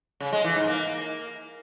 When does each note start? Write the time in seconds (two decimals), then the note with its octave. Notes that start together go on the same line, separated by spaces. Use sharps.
0.20 C#3
0.32 G#3
0.44 E3
0.56 G#2
0.68 A#3